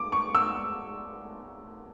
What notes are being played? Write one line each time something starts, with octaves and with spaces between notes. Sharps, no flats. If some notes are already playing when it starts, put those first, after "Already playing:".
Already playing: D6
C#6
E6